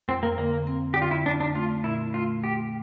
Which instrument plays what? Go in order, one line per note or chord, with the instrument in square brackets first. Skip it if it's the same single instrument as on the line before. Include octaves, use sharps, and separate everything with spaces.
[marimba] F2 [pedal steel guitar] C4
[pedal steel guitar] A#3
[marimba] D3 [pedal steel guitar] A#3
[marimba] C4
[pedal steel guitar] G4
[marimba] D3
[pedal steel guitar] F4
E4
[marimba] D3 [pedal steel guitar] D4
[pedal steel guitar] D4
[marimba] A3 [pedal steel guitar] F4
[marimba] A#2 [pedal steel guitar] E4
[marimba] A3 [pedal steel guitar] F4
[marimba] A3 [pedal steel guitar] G4